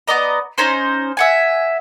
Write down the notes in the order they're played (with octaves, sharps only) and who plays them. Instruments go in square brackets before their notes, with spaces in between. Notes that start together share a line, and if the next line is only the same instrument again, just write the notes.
[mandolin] B3 D5 D#5 A#5
C#4 D#4 C5 C6
E5 F#5 G#5